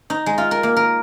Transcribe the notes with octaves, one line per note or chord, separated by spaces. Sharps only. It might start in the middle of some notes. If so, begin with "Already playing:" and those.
D#4
G#3
F4
A#4
A#3
A#4